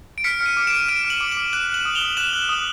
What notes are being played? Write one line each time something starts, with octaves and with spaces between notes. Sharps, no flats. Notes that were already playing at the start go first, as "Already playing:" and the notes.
D7
F6 B6 C#7
F6
C#7 D#7
D6
D7 E7
D6
F6 D7 E7
F6
E7 F#7
D6
E7 F#7
D6
F#6 E7 F#7
F#6 E7 F#7
D#6
F7 G7
D#6
F#6 E7 F#7
F#6
D#6